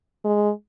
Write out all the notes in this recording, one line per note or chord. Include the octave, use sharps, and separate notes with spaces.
G#3